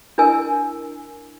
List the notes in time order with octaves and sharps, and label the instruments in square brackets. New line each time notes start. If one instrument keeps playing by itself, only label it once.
[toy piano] D4 E4 A#4 G#5 E6